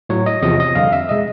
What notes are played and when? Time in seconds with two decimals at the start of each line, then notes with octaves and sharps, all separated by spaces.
0.09 A2 F#3 C#5
0.26 D#5
0.42 E2 C3 F3 D#5
0.60 D#5
0.75 F2 D3 G3 F5
0.92 E5
1.09 B2 G#3 D#5